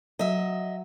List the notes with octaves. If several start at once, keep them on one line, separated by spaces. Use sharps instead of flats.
F#3 D#5 E5